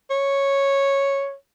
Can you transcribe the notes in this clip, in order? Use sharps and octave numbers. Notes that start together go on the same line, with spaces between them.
C#5